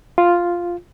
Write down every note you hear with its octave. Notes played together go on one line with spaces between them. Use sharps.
F4